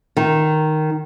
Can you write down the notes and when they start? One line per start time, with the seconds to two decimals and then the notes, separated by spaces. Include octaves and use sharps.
0.17 D#3